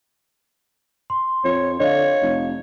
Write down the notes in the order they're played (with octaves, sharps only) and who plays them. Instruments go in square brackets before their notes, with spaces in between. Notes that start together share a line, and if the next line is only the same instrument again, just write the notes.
[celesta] C6
[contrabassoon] F2 [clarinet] C#5
[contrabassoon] D3 [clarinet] C#5 [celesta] D#5 F5
[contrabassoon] F1